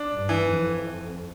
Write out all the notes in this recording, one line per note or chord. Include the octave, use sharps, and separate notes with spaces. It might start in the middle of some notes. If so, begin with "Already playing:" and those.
Already playing: D4
G2
E3
F2